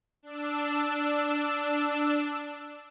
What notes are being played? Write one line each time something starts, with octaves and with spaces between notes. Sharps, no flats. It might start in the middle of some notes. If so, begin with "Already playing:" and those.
D4 E6